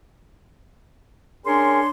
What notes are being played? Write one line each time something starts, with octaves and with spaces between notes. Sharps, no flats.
C#4 D4 G#4 A#4 C#5 C6